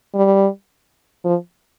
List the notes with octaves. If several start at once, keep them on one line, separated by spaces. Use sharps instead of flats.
G3
F3